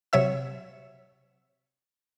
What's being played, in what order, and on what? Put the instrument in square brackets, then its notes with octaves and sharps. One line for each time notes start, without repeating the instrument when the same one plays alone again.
[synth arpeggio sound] C3 F#3 C#5 E5 E6